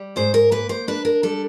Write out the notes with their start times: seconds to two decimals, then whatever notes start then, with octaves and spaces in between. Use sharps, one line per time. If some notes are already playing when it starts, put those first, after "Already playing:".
Already playing: G3
0.16 G#2 C5
0.34 A#4
0.51 A#3 B4
0.69 C5
0.88 D4 B4
1.05 A#4
1.23 G3 A4